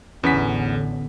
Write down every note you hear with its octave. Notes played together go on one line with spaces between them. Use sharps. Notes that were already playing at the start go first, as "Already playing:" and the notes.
A1 E2 D3 B3 C#4 B6